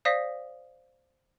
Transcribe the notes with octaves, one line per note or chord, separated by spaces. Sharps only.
C5 D5 F5 D#6 A#6 B6